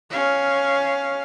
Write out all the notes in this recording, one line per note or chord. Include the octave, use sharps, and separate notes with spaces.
C#4 F5